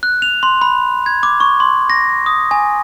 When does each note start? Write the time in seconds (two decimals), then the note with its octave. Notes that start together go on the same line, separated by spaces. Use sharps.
0.03 F#6
0.22 F7
0.43 C6
0.62 B5
1.06 G#6
1.23 D6
1.40 C#6
1.60 C6
1.90 A#6
2.26 D#6
2.51 G#5